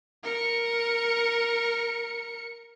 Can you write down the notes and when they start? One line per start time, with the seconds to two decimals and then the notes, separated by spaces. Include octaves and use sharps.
0.24 A#4 C#7